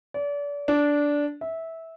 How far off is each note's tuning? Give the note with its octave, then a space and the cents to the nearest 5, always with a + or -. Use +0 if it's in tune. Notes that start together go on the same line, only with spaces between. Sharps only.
D5 -35
D4 -10
E5 -15